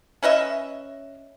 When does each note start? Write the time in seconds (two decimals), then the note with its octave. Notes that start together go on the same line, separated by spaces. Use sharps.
0.23 C#4 B4 D#5 E5